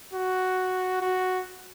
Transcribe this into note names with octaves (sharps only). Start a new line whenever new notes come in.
F#4
F#4